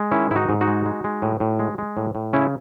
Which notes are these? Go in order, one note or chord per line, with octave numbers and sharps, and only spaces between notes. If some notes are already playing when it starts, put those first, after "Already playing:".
Already playing: G#3
D#3 C#4 E4
G#2 E4
D#4 F#4
G#2
D#4 F#4
G#3
G#3
G#3
A2
A2
G#3
G#3
A2
A2
C#3 C#4 E4